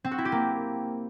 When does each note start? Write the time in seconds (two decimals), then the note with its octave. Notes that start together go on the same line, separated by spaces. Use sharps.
0.04 C4
0.11 F#4
0.18 E4
0.25 G4
0.32 A#3